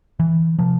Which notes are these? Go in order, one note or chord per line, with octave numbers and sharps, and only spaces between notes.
E3
C3 F3